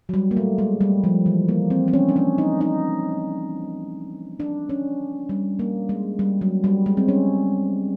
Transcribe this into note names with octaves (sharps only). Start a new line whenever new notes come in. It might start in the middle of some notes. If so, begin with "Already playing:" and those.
F#3
G3
A#3
A3
G#3
G3
F3
E3
A#3
C4
C4
C#4
D4
C#4
D#4
D#4
D4
C#4
G3
A#3
G#3
G3
F#3
G3
G#3
C4
C#4